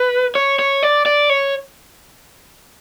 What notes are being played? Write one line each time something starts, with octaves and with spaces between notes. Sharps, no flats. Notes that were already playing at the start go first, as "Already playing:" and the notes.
Already playing: B4
C#5
C#5
D5
D5
C#5